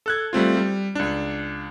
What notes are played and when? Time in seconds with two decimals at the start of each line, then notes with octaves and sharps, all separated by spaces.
0.06 A4 F#6 G#6
0.33 G3 A3 C4 F4
0.57 G3
0.95 C#2 D4